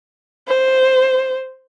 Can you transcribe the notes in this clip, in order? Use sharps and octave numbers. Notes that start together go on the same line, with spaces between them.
C5